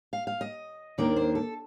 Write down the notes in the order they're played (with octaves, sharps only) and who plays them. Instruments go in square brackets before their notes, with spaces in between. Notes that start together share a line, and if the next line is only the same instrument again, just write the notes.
[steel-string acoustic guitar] F5
F5
D#5
D#2 D#3 A#3 D4 D5
C5
A4